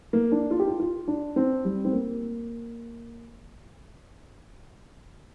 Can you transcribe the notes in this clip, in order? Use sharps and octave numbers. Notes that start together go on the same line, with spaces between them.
A#3
D4
F4
G4
F4
F4
D4
C4
G3
C4
A#3